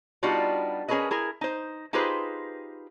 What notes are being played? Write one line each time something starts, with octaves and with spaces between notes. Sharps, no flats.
G3 B3 D4 D#4 F4 F#4
C#4 G#4 A#4 B4 D#5
E4 G#4 A#4
D#4 C5
D#4 F4 G4 G#4 B4 C5